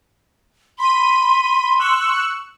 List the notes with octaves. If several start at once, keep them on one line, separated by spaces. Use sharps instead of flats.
B5 C6 D#7
C#6 E6 F#6